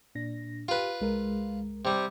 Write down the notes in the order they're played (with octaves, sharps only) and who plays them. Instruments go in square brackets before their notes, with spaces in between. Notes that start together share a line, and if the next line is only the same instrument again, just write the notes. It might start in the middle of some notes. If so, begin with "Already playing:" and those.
[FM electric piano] A#2 D4 A#6
[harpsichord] F4 B4 [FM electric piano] G4
[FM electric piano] C2 G#3 A#4
[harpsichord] C3 G3